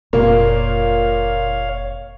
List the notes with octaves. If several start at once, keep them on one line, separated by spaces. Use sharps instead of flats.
F1 A#2 A#3 C#5 F5